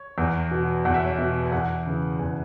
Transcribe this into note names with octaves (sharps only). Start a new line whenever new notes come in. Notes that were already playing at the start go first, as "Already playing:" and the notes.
Already playing: C#5
E2
B2
E2 F#5
E5
C#5
E5
B2
G#5
E2 F#5
C#3 E3
E2 G#5